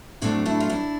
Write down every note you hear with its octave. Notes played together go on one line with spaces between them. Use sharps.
A2 F#3 A3 C4 D4
D4 E4
F4
D4 E4